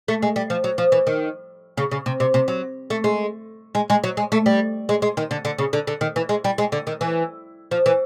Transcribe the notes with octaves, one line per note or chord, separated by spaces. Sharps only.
A3
G#3
G3
F3
F#3
F3
E3
D#3
C#3
C#3
C3
C3
C3
F#3
A3
G#3
G#3
G#3
F#3
G#3
A3
G3
G#3
G#3
D#3
D3
D3
C#3
D3
D3
D#3
E3
G#3
G3
G#3
D3
D#3
E3
F3
E3